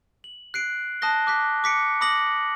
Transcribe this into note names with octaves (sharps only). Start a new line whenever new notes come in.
F#7
F#6 C7 D7
A5 D#6 F#6 A#6 G7
D6 F#6 B6
D6 B6 C#7 D7
B5 D6 D#6 A#6 F#7